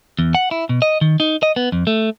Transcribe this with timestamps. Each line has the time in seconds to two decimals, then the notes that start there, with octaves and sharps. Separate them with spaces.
0.19 E2
0.35 F#5
0.51 E4
0.69 B2
0.82 D#5
1.01 D#3
1.20 D#4
1.43 D#5
1.56 B3
1.72 F2
1.87 A3